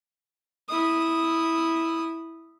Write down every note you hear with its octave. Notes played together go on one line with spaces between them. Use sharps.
E4 D#6